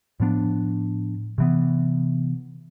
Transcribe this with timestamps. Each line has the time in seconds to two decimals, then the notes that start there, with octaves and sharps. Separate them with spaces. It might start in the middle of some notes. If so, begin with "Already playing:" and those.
0.20 A2 F3 B3 D4
1.38 C3 E3 B3